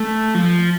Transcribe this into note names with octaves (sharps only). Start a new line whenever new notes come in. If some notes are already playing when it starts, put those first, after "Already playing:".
Already playing: A3
F3